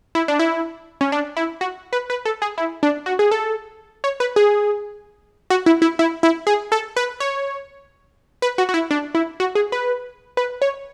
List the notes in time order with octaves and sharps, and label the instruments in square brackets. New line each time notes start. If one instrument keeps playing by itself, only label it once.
[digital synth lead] E4
D4
E4
C#4
D4
E4
F#4
B4
B4
A4
G#4
E4
D4
F#4
G#4
A4
C#5
B4
G#4
F#4
E4
E4
E4
E4
G#4
A4
B4
C#5
B4
F#4
F#4
E4
D4
E4
F#4
G#4
B4
B4
C#5